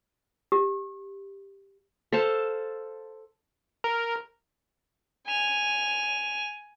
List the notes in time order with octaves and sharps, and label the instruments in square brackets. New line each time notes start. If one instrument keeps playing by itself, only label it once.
[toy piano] G4
[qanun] A4 C5 F5 A5
[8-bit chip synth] A#4
[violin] G#5 F7